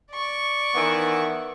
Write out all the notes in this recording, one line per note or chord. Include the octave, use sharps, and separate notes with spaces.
D5 C#6
D#3 E3 B3